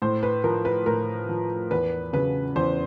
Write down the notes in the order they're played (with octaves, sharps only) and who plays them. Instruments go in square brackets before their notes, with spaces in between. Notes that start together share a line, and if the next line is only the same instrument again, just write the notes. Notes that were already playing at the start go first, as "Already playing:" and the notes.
[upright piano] A2 C5
B4
F3 A#4
B4
A2 A#4
F3
E2 B4
C#3 F#3 B4
E2 C5